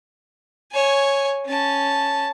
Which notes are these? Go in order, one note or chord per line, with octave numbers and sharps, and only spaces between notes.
C#5 G#5
C#4 A5